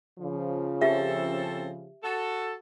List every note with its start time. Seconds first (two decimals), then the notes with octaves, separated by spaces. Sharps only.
0.19 C#3 F3
0.81 C4 C#4 G4 A4 E5
2.04 F#4 A4